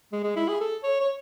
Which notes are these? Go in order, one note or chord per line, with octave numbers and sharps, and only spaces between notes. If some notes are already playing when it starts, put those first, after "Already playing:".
G#3
G#3
E4
G#4
A4
C#5
C#5